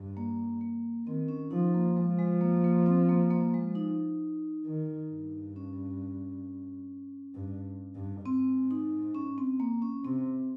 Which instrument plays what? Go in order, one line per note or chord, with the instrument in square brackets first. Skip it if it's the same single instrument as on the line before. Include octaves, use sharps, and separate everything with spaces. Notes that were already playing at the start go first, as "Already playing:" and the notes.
Already playing: [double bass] G2
[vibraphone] A#3
A#3
[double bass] D#3 [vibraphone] C4
[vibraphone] C#4
[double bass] F3 [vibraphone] D#4
[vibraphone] A#3
[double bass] F3 [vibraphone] G#3
[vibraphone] G#3
A#3
A#3
C4
A#3
A#3
G#3
D#4
[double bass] D#3
G2
[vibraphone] C#4
[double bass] G2
G2
[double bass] G#2 [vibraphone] C4
[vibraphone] D#4
C#4
C4
A#3
C#4
[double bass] C3 [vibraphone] C4